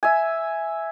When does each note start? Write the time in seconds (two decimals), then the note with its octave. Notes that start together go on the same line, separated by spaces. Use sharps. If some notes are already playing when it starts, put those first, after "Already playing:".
0.03 E5 G#5